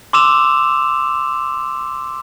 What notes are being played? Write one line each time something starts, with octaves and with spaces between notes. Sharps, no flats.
C6 D6 E6 E7 F7